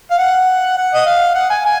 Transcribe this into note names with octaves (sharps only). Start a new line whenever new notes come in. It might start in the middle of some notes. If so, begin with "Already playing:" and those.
F5
F#5
F#5
D#5
F5
F#5
G#5
G#5